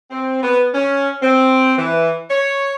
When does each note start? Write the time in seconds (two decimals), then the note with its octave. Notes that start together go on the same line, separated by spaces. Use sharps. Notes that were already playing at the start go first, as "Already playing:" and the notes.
0.11 C4
0.43 B3
0.74 C#4
1.22 C4
1.78 E3
2.30 C#5